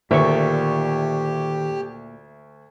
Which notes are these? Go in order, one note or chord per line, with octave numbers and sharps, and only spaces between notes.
D2 A#2 D#3 G4 E5 C#6